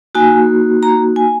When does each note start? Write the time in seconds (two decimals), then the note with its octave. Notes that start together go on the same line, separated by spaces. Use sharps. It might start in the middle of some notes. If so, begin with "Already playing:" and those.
0.15 A#3 D#4 F#4 G#5
0.83 A#5
1.16 G#5